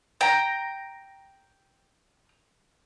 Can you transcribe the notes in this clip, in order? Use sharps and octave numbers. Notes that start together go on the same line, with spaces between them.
G5 A#5